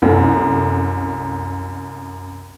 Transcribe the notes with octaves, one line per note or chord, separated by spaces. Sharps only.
C2 F#2 A3